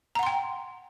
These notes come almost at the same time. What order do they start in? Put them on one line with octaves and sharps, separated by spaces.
A#5 F#5 C6 G5